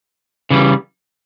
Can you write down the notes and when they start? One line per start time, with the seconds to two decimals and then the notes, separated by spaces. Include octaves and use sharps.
0.50 C#3 E3 G3